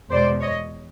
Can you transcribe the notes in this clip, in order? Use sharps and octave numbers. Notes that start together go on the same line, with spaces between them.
E2 B2 G#3 C5 D5
C#5 D#5